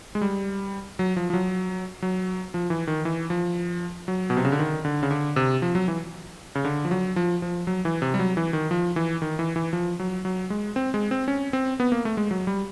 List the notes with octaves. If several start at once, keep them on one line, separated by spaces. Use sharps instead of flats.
G#3
G3
F#3
F3
F3
F#3
F#3
F3
E3
D#3
E3
F3
F#3
B2
C3
C#3
D3
D#3
D3
C#3
D3
C3
F3
F#3
E3
C#3
D3
F3
F#3
F3
F3
F#3
E3
C3
G3
F#3
E3
D#3
F3
E3
D#3
E3
E3
F3
F#3
F#3
G#3
C4
G#3
C4
C#4
C4
B3
A#3
A3
G#3
F#3
G3